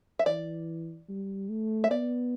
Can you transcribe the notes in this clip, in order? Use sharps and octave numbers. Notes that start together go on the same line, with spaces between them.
E5
E3 D5
G3
A3
E5
B3 D5